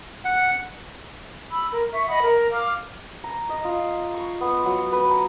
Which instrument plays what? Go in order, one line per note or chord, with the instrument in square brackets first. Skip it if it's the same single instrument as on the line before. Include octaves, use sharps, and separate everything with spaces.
[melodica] F#5
[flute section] B5 E6
A#4
E5 C#6
D#5 F#5 B5 D#6
A#4
F5 D6 F6
[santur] A#5
D#5
F4
C#6
B3
F#3
B4
A#5